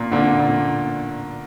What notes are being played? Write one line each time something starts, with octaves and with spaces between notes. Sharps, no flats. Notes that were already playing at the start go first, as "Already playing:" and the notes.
Already playing: A#2
A#2 D3
A#2